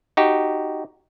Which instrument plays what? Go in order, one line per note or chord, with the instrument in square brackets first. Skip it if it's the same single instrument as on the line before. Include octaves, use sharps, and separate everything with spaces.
[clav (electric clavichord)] D#4 F#4 G4